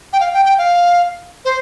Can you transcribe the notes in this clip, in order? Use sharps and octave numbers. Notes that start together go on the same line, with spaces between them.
G5
F5
G5
G5
F5
C5